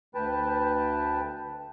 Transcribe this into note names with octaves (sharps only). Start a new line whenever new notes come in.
D2 B4 G5 A5